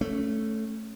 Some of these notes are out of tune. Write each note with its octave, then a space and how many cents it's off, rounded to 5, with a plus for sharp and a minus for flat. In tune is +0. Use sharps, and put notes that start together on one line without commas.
A3 +0 C#4 +0